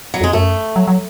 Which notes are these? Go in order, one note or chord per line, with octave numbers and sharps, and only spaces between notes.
F#3
F2 G#3
F#2 A3
F#3
F#3